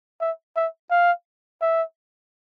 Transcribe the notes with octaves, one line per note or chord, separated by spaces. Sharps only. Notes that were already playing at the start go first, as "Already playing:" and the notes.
E5
E5
F5
E5